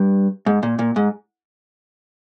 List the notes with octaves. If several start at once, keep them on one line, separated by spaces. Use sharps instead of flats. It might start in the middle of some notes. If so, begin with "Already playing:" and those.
Already playing: G2
G#2
A#2
A#2
G#2